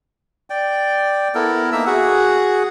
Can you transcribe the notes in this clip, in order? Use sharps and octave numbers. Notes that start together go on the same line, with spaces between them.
D5 G5
B3 E4 A4 A#4
A#3 D#4 E5 E6
F#4 G#4 F#5